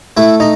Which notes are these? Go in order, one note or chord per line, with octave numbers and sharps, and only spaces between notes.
A3 E4 E5
D#4 D#5